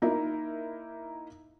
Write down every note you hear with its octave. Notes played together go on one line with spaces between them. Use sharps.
A#3 D#4 E4 A#4